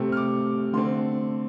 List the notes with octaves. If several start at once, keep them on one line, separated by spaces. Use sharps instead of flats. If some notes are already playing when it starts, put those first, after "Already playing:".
Already playing: C3 A3 C4
F6
D6
D3 A3 C4 C6